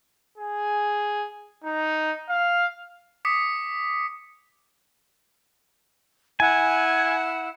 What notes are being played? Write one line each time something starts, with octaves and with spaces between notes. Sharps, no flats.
G#4
D#4
F5
D6 D#6 B6 C#7
E4 F#5 G#5